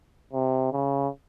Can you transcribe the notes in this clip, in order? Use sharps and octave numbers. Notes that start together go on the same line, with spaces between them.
C3
C#3